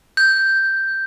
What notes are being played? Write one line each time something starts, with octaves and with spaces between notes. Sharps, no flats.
G6